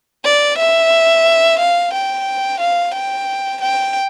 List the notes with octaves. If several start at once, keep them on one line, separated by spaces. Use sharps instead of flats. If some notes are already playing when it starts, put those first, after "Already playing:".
D5
E5
F5
G5
F5
G5
G5